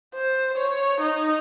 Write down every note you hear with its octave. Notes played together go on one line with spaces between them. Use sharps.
C5
C#5
D#4